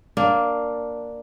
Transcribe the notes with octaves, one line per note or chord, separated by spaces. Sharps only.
A#3 D4